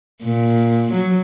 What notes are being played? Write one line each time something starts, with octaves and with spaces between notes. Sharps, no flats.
A#2
F#3